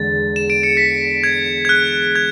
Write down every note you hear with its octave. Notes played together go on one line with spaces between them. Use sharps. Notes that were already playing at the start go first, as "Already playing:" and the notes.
Already playing: E2 D3 G#3 A6
E7
D7
C#7
B6
G#6
G#6
F#6
G#6